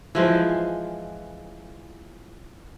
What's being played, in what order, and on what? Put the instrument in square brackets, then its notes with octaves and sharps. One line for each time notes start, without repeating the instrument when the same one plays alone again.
[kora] E3 F3 G#3